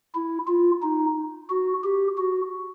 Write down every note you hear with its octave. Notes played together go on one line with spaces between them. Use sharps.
E4
F4
D#4
F#4
G4
F#4